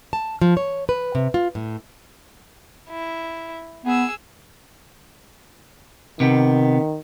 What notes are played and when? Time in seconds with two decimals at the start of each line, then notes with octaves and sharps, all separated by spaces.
0.13 A5
0.41 F3
0.57 C#5
0.89 B4
1.15 C3
1.34 F4
1.55 A2
2.90 E4
3.86 B3 G#4 E6
6.20 C3 D#3 B3